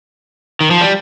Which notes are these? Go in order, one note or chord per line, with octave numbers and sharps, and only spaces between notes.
D#3
F3
G3